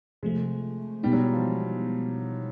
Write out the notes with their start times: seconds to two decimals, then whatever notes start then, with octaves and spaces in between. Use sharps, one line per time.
0.23 C3 F3 G#3 A3
1.03 B2 G3 G#3 B3 D#4
1.13 F#3
1.23 E3
1.33 F3